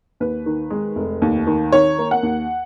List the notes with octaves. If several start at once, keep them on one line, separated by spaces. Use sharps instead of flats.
D#2 B4
D#3
G#3
F1
D#2
D#3
D#3 C#5
A#3
F#5
D#2